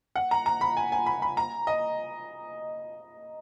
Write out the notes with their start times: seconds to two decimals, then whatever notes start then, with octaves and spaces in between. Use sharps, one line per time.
0.16 F#5
0.31 A#5
0.46 A#5
0.61 B5
0.77 G#5
0.92 G#5
1.06 B5
1.22 B5
1.37 A#5
1.67 D#5